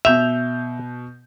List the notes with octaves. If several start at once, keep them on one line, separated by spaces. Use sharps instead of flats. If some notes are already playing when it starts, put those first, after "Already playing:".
B2 E5 G6 F7